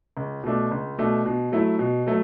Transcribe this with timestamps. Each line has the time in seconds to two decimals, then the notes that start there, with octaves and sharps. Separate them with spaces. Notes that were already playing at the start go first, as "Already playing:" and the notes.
0.17 C#2
0.44 B2 A3 D4
0.71 C#2
0.98 B2 A3 D4
1.25 B2
1.52 F#3 A3 E4
1.79 B2
2.07 F#3 A3